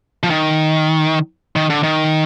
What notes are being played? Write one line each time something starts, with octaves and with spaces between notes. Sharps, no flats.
F3
D#3
D#3
D3
D#3